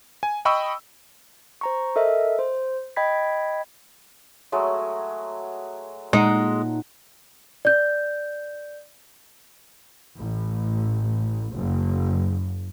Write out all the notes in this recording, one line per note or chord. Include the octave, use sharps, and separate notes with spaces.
G#5
D#5 G5 B5 C#6 D#6 E6
C5 A#5 C#6
A4 A#4 D#5 E5
C5
D#5 G5 B5 G#6 B6
F#3 G#3 A3
A#2 G#3 D#4 F#5
D5 G6
A1
F#1